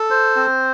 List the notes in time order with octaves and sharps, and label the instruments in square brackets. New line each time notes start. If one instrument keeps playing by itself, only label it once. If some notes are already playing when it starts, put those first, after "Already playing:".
Already playing: [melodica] A4
C5
C4